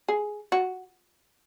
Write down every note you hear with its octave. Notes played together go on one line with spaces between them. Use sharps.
G#4
F#4